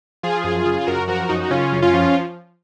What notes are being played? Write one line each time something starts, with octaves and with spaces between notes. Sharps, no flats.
F3 F4 G#4
F#2
C#3
G#4
F#2 F#4 A#4
F3 F#4 A#4
F#2 D#4 F#4
C#3 C#4 F4
F#2
C#4 F4
F3